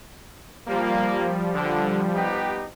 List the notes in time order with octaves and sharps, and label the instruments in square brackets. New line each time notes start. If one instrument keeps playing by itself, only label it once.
[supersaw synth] F3 G3 [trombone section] A#3
[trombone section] D3
B3 D#4 G4